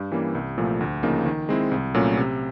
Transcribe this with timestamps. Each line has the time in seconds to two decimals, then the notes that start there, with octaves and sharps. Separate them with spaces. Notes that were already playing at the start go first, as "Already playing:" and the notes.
Already playing: G2
0.12 E3 G3 A#3 C#4
0.35 C2
0.57 A#2 F3 A3
0.81 D2
1.03 C#3 F3 A#3 D#4
1.26 D#3
1.49 G#3 C4 E4
1.71 C2
1.94 A#2 F#3 A3 C#4
2.17 C3